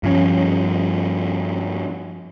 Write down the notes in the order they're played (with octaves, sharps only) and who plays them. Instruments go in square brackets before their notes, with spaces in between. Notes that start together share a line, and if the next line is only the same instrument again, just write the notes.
[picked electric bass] G2 F3 C#4